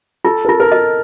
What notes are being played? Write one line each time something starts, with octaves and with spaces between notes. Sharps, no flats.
F4 A4
A#4
F4 A4
A#4
D#5